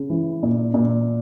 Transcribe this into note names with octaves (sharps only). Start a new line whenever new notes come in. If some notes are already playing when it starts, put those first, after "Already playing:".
Already playing: C#3
E3
A#2
A#2